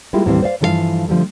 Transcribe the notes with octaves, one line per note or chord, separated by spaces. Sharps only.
G3 G#3 A#3 E4 F4 G4
D#2 A2 E3 G3 C4 F5
C5 D5 F5
G2 E3 F3 A4 A#4 F5
D3 F3 G3 A3